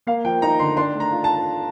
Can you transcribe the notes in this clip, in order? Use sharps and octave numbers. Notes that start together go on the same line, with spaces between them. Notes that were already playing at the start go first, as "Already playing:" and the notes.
A#3 F5
F3 G5
D#4 A#5
D3 C6
D4 C6
A3
A#5
F4
A5